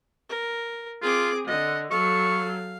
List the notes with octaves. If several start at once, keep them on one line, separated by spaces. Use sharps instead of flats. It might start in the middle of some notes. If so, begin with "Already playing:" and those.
A#4
C4 F4 G#4 D6
D3 D#5 F#5
F#3 A4 F5 C#6